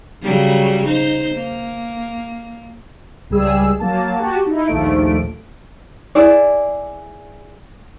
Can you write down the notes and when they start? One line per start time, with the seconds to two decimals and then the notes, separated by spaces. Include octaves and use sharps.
0.23 C#3 F#3 G3
0.86 D#4 C5
1.35 A#3
3.30 C#2 G3 G#4 E6
3.80 F#3 A#3 A5
4.18 F#4 G4 A5
4.47 D#4 E4
4.67 A#1 D#2 F3 A3 D7
6.15 E4 G#4 D5